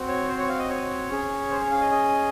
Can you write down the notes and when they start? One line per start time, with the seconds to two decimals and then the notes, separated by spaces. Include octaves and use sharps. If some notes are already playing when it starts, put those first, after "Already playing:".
Already playing: C4 F#4
0.08 C#5
0.28 C5
0.38 C#5
0.49 F5
0.59 D#5
0.70 C#5
1.09 C#4 G#4
1.51 C5
1.60 C#5
1.71 F5
1.81 D#5
1.91 D#5